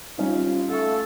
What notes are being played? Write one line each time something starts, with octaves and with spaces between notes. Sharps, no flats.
G3 C#4 D#4 F4
A3 A4 F5 C#6